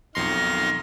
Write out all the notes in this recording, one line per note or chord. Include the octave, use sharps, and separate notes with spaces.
B1 F2 D#3 F5 C6 C#6 A#6